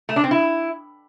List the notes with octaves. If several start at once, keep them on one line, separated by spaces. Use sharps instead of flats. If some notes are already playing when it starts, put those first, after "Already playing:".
A3
D4
C4
E4